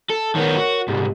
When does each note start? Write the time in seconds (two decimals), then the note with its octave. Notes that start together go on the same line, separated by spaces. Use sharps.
0.10 A4
0.35 D#3 B3 A#4 C#5
0.56 F#4
0.88 C2 G#2 G4